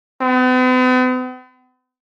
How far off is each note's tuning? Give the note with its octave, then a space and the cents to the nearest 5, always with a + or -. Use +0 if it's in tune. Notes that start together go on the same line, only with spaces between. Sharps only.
B3 +45